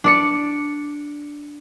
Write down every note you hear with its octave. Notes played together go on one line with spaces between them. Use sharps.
D4 D5 C#7